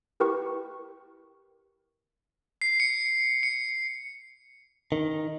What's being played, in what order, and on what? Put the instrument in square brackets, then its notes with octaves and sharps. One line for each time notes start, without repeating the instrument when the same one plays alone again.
[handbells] E4 G4 A#4 B4 G5 C#6
[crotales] C7
C#7
C#7
[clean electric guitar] D#3